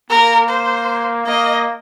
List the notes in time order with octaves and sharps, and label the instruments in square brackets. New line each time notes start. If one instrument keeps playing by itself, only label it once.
[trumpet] A#3 [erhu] A#4
[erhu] C5
[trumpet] A#3 [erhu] D#5